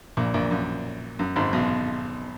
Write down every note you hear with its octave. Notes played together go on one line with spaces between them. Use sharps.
A#1 A#2
A#1 A#2
F#2
F#2
G#1 G#2
B1 B2